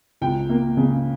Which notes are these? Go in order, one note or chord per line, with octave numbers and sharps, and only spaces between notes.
C#2 G5
A#3
C#3